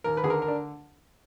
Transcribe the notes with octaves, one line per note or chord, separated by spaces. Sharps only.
D#2 A#4
B4
D3 G#4
A#4
A#4
D4